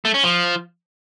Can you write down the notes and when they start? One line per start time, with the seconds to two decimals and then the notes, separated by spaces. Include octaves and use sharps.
0.05 A3
0.14 C#4
0.24 F3